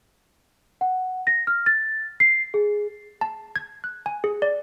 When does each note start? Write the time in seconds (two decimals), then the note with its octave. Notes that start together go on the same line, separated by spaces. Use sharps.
0.81 F#5
1.27 A#6
1.47 F6
1.66 A6
2.20 C7
2.54 G#4
3.21 A5
3.56 G#6
3.84 F#6
4.06 G#5
4.24 G#4
4.42 D5